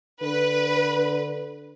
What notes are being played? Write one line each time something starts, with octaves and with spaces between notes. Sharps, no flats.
D3 B4